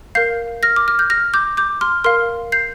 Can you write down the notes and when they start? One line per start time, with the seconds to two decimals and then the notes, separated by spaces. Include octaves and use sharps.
0.15 A#4 F5 G6 C7
0.63 F6 A#6
0.76 D6
0.88 F6
0.99 G6
1.10 F6 A#6
1.34 D6 G6
1.57 D6 G6
1.81 C6 F6
2.04 A#4 F5 C6 F6
2.52 G6 C7